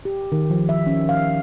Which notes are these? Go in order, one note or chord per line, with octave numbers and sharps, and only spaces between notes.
G4
D#3
F3
E5
C#4
F5